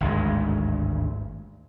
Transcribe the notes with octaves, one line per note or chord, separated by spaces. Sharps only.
G#1 D2 G2 G#3